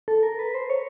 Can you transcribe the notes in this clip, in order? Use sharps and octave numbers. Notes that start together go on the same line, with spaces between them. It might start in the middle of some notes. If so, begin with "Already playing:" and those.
A4
A#4
B4
C5
C#5